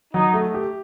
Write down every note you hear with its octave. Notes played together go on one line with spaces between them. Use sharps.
F#3 D#4
A3
G4